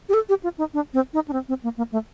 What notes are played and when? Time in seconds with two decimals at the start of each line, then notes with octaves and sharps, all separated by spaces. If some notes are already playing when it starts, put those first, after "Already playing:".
0.09 G4
0.14 A4
0.29 G4
0.43 F4
0.58 D#4
0.74 D4
0.94 C4
1.14 D#4
1.28 D4
1.33 C4
1.49 C4
1.64 A#3
1.77 A#3
1.92 A3